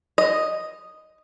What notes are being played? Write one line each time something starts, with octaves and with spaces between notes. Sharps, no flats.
D#5